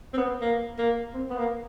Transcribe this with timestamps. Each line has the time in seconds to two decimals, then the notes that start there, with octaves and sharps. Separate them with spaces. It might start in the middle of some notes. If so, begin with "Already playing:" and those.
0.13 C4
0.17 B3
0.41 A#3
0.78 A#3
1.13 C4
1.30 B3
1.37 A#3